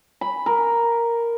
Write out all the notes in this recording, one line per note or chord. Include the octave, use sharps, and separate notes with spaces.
B5
A#4